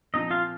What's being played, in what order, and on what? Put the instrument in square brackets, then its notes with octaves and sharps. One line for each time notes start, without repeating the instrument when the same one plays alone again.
[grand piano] A#2 F3 C4 [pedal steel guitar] D#4 D#5
[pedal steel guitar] F4 F5